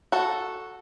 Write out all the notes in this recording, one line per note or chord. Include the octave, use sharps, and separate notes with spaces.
F#4 A4